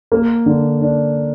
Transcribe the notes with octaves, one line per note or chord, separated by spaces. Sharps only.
A#3
D3
D4